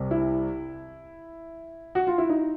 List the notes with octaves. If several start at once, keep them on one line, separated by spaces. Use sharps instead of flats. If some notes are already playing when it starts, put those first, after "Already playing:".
Already playing: C2 C3
E4
F#4
F4
E4
D#4